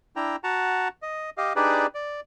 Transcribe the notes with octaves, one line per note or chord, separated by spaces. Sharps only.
D4 E4 G5 A#5
F#4 F#5 A5 A#5
D#5
G4 D#5 F5
D4 D#4 G4 G#4 B4 D5
D5